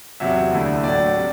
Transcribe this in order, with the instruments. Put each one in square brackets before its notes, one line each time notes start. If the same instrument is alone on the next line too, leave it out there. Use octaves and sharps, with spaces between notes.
[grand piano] E2 C3 F#3 E5
D2 D3 A3 E4
A2 F#3 A3 D4 D5
C3 G3